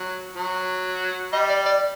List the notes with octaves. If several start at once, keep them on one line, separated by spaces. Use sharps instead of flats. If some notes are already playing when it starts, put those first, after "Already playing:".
Already playing: F#3
F#3
G3 D#5
D5
D5